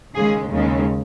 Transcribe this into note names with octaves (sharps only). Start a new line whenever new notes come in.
D#2 C#3 G#3 G#4
D#2 C#3 G#3